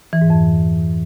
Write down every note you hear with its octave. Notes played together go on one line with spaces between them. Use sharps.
E3
G#2
F2